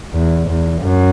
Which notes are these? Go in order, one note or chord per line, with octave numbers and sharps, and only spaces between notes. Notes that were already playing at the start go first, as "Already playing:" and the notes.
E2
E2
F#2